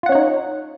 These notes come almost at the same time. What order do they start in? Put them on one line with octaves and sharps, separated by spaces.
F4 F#5 C#4 C#5 D#4